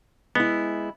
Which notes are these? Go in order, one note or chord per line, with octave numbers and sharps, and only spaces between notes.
G#3 B3 E4